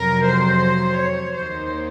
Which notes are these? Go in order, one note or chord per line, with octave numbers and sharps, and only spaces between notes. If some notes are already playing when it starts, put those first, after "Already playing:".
Already playing: F2 C3 F#3 A#4
C5
C#5
D#2 D#3 A#3 D#4 C5